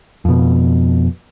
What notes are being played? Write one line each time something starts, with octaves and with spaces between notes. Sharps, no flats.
F2 B2